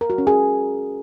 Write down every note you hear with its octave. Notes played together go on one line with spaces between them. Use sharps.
A#4
F#4
C#4
G#4